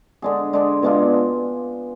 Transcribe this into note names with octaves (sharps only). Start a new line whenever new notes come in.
D3 G#3 D4 G#4
D3 G#3 D4 G#4
B2 G#3 D4 F4